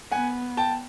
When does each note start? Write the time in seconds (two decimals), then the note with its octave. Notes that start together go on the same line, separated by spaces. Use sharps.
0.11 B3 F#5 G#5
0.57 G5 A5